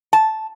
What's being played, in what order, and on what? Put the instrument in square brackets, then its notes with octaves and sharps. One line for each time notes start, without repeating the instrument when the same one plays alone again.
[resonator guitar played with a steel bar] A5